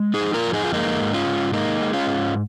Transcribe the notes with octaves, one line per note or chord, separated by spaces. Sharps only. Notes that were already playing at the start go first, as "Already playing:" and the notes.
Already playing: G#3
D#4 G#4
F2
F4 A#4
F2
D#4 G#4
F4
G#3 A#3 D#4
G#2
C#4 F4
G#2
G#3 A#3 D#4
G#3
C#4 F4
G#2